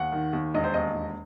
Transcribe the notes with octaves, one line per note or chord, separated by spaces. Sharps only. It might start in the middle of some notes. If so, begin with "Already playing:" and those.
Already playing: D#2 F#5
D#3
D#2
E1 D#5
C5
D#2 D#5
E1